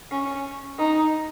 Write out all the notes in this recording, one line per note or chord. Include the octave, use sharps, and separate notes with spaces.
C#4
D#4